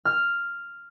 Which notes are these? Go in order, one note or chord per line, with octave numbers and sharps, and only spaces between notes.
F6